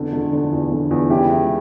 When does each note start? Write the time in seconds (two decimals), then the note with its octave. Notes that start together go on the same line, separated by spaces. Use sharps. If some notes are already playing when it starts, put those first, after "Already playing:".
Already playing: E2 D3
0.13 D3
0.33 D3
0.52 E2
0.72 D3
0.91 E2
1.10 C#3 E4 G4
1.30 C#2